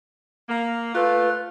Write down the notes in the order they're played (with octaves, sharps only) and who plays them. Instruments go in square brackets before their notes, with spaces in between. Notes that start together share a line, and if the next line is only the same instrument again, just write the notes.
[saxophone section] A#3
[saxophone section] A3 F4 [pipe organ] B4